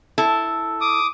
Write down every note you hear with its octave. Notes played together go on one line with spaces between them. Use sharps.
E4 A4
D6 D#6